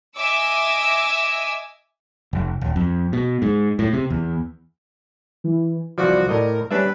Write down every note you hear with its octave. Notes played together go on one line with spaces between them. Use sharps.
D#5 E5 G#5 D6 E6
F1
D#1
F2
B2
G#2
A2
C3
E2
E3
C2 E3 F3 F#4 D5
A2 A#4 D#5
G3 C#4 D4 B4 E5